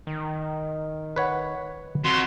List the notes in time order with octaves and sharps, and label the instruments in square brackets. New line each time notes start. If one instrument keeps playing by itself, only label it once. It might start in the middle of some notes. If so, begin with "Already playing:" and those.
[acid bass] D#3
[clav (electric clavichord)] B4 C#5 F#5
[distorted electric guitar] F2 [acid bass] F#4 [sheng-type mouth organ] C6